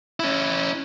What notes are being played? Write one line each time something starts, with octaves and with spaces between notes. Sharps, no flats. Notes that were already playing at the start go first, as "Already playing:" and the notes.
C#4 E4